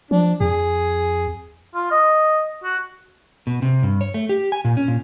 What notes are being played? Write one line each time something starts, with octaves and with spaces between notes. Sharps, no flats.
F3 D4
F2 G#4
F4
D#5
F#4
B2
C3
G2
C#5
A3
G4
G#5
A#2
C#4
A#2